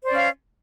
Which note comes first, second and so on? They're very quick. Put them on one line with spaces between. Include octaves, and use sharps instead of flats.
C5 D5 C#4 F5